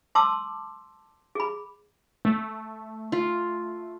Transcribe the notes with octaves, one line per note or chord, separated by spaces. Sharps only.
A5 C6 D6 E6
G#4 B5
A3
F4